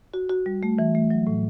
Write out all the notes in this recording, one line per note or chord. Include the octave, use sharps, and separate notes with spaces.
F#4
F#4
G3
A3
E3
A3
F#3
A2